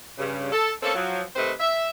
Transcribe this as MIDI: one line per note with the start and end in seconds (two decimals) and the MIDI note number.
0.18 0.52 43
0.18 0.52 49
0.52 0.71 69
0.83 0.94 58
0.83 0.94 60
0.83 0.94 61
0.83 0.94 69
0.95 1.21 53
0.95 1.21 54
1.36 1.52 48
1.36 1.52 51
1.36 1.52 57
1.36 1.52 71
1.36 1.52 72
1.36 1.52 75
1.60 1.90 76